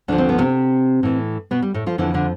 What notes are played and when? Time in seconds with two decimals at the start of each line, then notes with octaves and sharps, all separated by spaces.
0.08 D2 D3 F3 D4
0.18 C4
0.29 B3
0.38 C3 C4
1.03 A2 E3
1.51 B2 B3
1.62 G3
1.74 A2 A3
1.86 F3 F4
1.98 F2 D3 E3 F3 E4
2.14 D3 D4